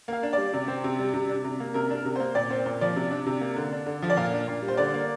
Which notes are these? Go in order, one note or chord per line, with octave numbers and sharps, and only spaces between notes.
A#3 F5
D4
G3 D5
C3
C4
C3
G3
C3
D4
C3
A#3
C3 A#4
D4
A#4
C3
A#3 C5
A#2 D5
C4 C5
A#2
F3 D5
C3
D4
C3
A#3
D3
D4
D3
F3
D5
A#2 F5
D4
A#2
G3
C5
D3 D5
A#3